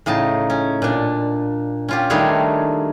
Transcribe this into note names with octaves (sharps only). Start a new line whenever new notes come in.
A2 C#3 D#4 A5
C#4
A#2 D4
C#4 F4 G4
D#3 G3 A3 D4 G#4 C#5